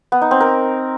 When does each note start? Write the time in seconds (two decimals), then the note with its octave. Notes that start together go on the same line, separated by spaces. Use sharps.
0.12 B3
0.22 D#4
0.31 C4
0.41 A#4